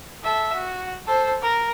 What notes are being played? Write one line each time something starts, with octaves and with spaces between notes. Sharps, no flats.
A4 E5
F#4
A4 C5
A#4